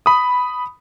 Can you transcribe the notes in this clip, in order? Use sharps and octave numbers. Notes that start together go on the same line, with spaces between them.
B5 D#6